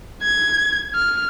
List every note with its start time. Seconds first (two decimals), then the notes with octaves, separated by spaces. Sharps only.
0.23 G#6
0.95 F6